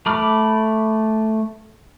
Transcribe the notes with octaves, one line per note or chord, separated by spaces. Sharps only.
A3 B5 D6 F6